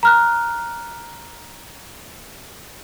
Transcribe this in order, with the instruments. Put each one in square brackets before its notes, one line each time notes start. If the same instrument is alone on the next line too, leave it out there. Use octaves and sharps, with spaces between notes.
[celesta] A#5 F6 F#6